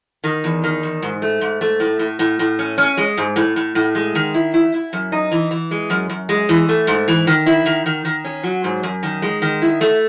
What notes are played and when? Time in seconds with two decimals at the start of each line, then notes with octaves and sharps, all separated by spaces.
0.24 D#3
0.44 E2
0.64 D#3
0.83 E2
1.02 G#2
1.22 A3
1.41 G#2
1.61 A3
1.80 A2
1.99 A2
2.19 A2
2.39 A2
2.59 C#4
2.78 C#4
2.97 G#3
3.18 G#2
3.36 A2
3.56 A2
3.75 A2
3.95 G#3
4.15 D#3
4.34 E4
4.54 E4
4.74 E4
4.93 F#2
5.12 D#4
5.31 E3
5.51 E3
5.71 G#3
5.90 F#2
6.10 F#2
6.29 G#3
6.49 E3
6.69 A3
6.87 G#2
7.08 E3
7.27 D#3
7.46 E4
7.66 D#3
7.86 D#3
8.05 D#3
8.25 C#4
8.43 F#3
8.64 G#2
8.83 F#2
9.03 D#3
9.22 G#3
9.42 D#3
9.62 E4
9.81 A3